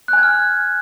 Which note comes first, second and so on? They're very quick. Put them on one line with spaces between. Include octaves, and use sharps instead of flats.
F#6 G#5 G#6 F6